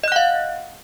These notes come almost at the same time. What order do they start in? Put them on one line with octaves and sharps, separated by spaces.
D#5 F#6 F#5 F5